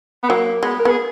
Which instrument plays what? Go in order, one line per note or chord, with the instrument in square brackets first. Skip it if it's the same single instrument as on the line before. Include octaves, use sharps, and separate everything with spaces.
[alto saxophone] B3
[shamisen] F#3 [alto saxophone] A#3
[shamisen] G#3 [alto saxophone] B3
[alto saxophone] A#4
[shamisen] B3 [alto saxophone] G#4